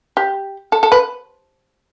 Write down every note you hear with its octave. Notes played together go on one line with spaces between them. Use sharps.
G4
A4
A4
B4